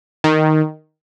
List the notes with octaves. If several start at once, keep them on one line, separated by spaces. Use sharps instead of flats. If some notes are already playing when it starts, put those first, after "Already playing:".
D#3